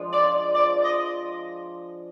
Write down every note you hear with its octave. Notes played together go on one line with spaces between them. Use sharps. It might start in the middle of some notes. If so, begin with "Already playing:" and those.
Already playing: F3 G#3 D4
D5
D5
D#5